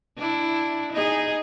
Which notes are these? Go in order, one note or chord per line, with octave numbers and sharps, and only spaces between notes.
D4 E4
D#4 G#4